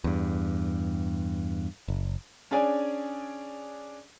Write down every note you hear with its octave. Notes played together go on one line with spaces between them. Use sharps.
E2 G2
F#1
C#4 D4 G#4 D5 G#5